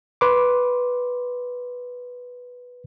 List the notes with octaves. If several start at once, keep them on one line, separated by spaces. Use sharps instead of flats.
B4 C6 D6